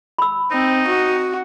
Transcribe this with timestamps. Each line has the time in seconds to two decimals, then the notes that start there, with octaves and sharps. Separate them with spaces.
0.18 B5 E6
0.51 C4 D#4
0.87 F#4